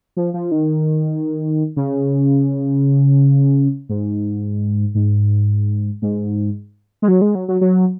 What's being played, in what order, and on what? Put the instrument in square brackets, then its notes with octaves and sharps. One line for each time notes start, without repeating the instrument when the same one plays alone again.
[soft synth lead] F3
F3
D#3
C#3
G#2
G#2
G#2
G#3
F#3
G#3
F#3
F#3
F#3